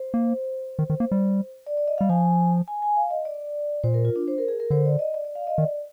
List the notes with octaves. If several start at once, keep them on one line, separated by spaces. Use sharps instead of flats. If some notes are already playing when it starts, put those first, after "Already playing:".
Already playing: C5
A#3
D#3
D#3
A#3
G3
D5
D5
D#5
G3 F5
F3 G#5
G#5
G#5
F5
D#5
D5
A#2 C5
A#4
F4
D4
C5
A#4
G#4
A#4
D3 C5
D5
D#5
D5
D5
F5
D#5
D#3 D5